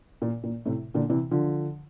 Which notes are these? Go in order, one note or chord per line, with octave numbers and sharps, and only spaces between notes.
A#2
A#2
A2 C3
A#2 D3
C3 E3
D3 F3